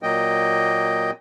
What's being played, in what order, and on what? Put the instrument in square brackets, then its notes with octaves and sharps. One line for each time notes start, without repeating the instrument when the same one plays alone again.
[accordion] A#2 F#3 A#3 D#5 G5